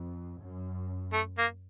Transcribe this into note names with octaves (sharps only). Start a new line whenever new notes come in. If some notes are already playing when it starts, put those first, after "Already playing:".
Already playing: F2
F#2
A3
A#3